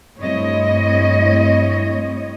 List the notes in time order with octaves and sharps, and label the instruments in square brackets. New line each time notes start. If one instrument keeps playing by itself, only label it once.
[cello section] G2 A3 C4 E4 C#5 D#5